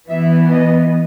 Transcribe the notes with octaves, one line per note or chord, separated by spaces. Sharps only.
E3 B3 E5
D#5